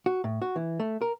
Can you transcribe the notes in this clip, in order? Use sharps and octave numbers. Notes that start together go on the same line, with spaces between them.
F#4
A2
F#4
E3
A3
A#4